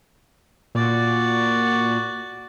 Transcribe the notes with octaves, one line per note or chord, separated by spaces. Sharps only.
A#2 F#4 D5